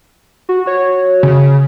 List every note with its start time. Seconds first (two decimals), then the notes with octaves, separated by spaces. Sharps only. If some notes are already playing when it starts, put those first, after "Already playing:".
0.49 F#4
0.66 F#4 C#5
1.23 C#3